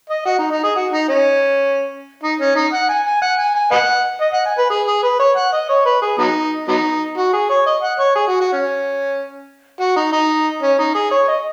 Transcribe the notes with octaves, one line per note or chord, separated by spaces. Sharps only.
D#5
F#4
D#4
D#4
G#4
F#4
D#4
C#4
D#4
C#4
D#4
F#5
G#5
G#5
F#5
G#5
G#5
B4 D#5 F#5
D#5
F#5
G#5
B4
G#4
G#4
B4
C#5
F#5
D#5
C#5
B4
G#4
F#3 B3 D#4
F#3 B3 D#4
F#4
G#4
C#5
D#5
F#5
C#5
G#4
F#4
F#4
C#4
F#4
D#4
D#4
C#4
D#4
G#4
C#5
D#5